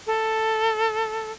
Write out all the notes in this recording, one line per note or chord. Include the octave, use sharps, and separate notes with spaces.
A4